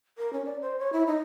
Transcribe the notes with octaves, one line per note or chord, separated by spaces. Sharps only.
A#4
C#4
D5
C5
C#5
E4
D#4